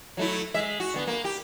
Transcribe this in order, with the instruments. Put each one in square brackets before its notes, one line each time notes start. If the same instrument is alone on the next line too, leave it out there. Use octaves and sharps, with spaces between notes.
[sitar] F#3 A3 E4
G#3 E5
F#4
D3 B3
A#3
G4